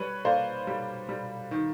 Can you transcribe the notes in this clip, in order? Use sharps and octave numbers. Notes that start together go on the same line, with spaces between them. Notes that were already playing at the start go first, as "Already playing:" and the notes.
Already playing: G3 B4 C#5
A#3 C5 D5
G3
G3
D#3